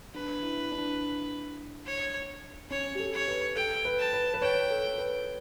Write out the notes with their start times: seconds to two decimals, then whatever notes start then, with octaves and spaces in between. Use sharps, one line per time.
0.14 D4 B4
0.43 E4
0.71 D4
1.86 C#5
2.70 C#4 C#5
2.95 G4
2.99 A4
3.13 C#5
3.28 B4
3.56 A4 G5
3.85 B4
3.99 A5
4.13 B4
4.34 B4
4.41 C#5 G5
4.70 A4
4.98 B4